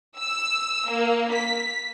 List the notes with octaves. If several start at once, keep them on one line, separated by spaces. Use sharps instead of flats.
E6
A#3
B6